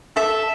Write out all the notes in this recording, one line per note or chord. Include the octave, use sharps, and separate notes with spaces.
A4 E5